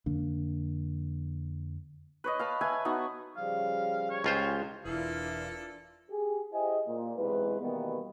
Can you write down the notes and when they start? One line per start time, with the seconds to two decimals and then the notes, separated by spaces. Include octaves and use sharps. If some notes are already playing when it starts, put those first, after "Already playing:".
0.06 F2 D3 A#3 D4
2.24 B4 C#5 D#5
2.39 F5 A5 B5
2.61 B4 E5 G#5 A5
2.85 B3 D#4 F#4
3.37 C#3 F3 G3 F5
4.10 C#5
4.24 C#2 F4 G4 G#4 C5
4.85 E1 E3 A#3 D4 E4 F4 A4
6.10 G4 G#4
6.53 E4 G4 G#4 C5 D#5 G#5
6.87 A#2
7.16 B1 E2 C3 G#3 E4 B4
7.60 B2 D#3 E3 G3 A#3 B3